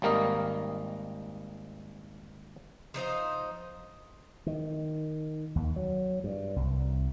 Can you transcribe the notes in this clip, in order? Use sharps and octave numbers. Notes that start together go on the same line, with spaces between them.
G#1 G3 A#3 A#4 D#5
F3 D#4 C5 D#5
D#3
D#2
F#3
G2
C2